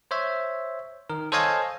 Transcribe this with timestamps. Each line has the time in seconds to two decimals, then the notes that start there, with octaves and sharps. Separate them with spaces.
0.11 C5 C#5 E5
1.10 D#3 A#4
1.32 A4 C5 C#5 D#5 F5 G#5